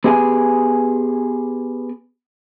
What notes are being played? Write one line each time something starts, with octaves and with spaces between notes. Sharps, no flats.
B3 G4 G#4 F#5 G#5